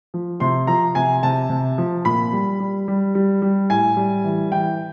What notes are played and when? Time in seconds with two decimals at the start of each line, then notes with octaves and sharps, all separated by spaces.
0.14 F3
0.40 C3 C6
0.67 F3 A#5
0.95 C3 G#5
1.23 C3 A5
1.50 C3
1.78 F3
2.05 A#2 B5
2.33 G3
2.60 G3
2.88 G3
3.15 G3
3.42 G3
3.70 A2 G#5
3.97 G3
4.25 E3
4.52 E3 G5